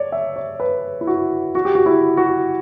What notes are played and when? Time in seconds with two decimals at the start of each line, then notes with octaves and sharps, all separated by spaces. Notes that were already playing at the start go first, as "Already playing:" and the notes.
Already playing: C#5 D5
0.12 E5
0.36 C#5
0.60 B4
1.01 E4
1.07 F#4
1.55 F#4
1.65 G4
1.75 F#4
1.86 E4
2.17 F#4